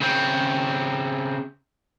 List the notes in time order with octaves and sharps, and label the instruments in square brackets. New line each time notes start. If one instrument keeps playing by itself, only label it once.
[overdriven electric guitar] C#3 C4